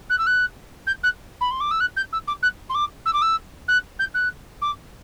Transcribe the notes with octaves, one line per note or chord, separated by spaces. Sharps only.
F#6
E6
F#6
G6
F#6
B5
C6
D6
E6
F#6
G6
E6
D6
F#6
C6
D6
E6
D6
E6
F#6
G6
F#6
D6